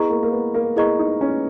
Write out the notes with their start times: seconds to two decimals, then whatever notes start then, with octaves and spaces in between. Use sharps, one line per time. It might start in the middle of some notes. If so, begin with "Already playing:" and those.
Already playing: B3 E4 G#4 D#5 A#5 C#6
0.10 A#3
0.23 A#3
0.32 B3
0.54 A#3
0.76 B3 E4 G#4 D#5 A#5 C#6
0.99 D#4
1.21 C#4